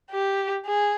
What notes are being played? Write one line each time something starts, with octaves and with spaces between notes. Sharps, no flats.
G4
G#4